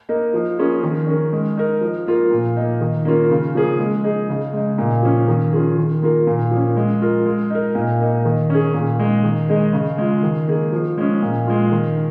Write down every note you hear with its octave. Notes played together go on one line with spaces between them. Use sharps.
A#3 D#4 A#4
F3
A#3 C#4 F4 G#4
D#3
C#4 A#4
G#3
D#4 A#4
F3
A#3 F4 A#4
A#2
A#3 D#4
D#3
A#3 C#4 F4 A#4
C#3
F3 A#3 C#4 G#4
G#3
D#4 G#4
C#3
G#3 D#4
A#2
F3 C#4
D#3
C#4 F4 G#4
D#3
A#3 F4 A#4
A#2
F3 C#4
G#3
F4 A#4
G#3
D#4 A#4
A#2
A#3 D#4
D#3
C#4 G#4
A#2
G#3 D#4
D#3
G#3 D#4 G#4
C#3
G#3 F4
D#3
A#3 D#4 G#4
F3
G#3 C#4
A#2
G#3 F4
D#3